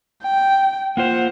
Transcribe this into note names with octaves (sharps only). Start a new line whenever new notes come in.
G5
A#3 F4 C5 F#5